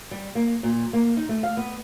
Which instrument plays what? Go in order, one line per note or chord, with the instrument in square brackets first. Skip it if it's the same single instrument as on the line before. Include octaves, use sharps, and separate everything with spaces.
[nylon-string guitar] G3
A#3
A#2
A#3
D#4
A3
F5
B3